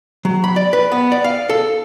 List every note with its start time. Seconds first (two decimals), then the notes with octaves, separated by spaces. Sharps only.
0.25 F#3
0.44 B5
0.56 D5
0.73 B4
0.92 B3
1.12 D5
1.24 F5
1.49 A4